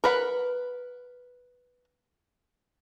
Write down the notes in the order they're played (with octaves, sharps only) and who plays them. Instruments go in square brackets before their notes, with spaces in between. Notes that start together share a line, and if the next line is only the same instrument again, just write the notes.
[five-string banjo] A#4 B4 F#5